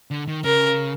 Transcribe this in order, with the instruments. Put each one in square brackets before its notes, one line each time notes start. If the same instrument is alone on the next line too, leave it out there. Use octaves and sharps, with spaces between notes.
[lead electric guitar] D3
D#3
[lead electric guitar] C#3 [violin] A#4